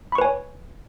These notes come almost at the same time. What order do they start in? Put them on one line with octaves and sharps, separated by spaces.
B5 C#6 B4 G#5 C#5